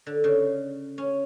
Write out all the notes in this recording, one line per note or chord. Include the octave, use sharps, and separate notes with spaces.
D3
C#3
C#4